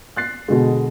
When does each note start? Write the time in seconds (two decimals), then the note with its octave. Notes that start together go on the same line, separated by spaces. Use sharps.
0.16 F#6 A6 C7
0.48 B2 D3 G#3